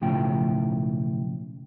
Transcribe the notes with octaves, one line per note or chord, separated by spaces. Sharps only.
B1 A2 C#3 F3 G5